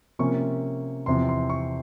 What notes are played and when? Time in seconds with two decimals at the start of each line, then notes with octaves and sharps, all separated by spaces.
0.19 C3 F3 A#3 C#4 C#6
1.06 E2 C3 F3 C6
1.29 C6
1.50 C#6